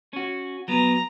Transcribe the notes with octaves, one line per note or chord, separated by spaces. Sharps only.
C#4 F#4
F#3 B3 A#5